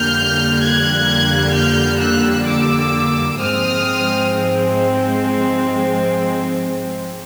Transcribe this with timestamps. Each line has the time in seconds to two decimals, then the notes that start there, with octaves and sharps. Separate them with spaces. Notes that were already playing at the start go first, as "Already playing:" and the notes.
Already playing: F2 D3 G3 A#3 F6 G6
0.63 F#6 G#6
1.55 F6 G6
2.01 E6 F#6
2.47 D6 E6
3.39 G#2 F3 G#3 C4 D#6 F6